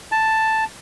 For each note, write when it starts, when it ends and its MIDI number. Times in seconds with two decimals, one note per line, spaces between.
0.12 0.64 81